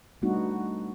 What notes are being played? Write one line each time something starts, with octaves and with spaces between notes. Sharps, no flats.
G3 A3 B3 D4 D#4 F#4